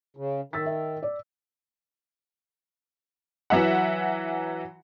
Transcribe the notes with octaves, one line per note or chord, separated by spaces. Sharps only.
C#3
D#3 E6 A6 B6
E5
D5
E3 F#3 E5 F#5